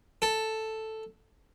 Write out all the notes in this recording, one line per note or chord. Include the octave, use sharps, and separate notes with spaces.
A4